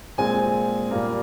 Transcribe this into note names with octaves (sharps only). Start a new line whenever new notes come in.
A#2 G#3 C4 G#5
A#2 G3 A#3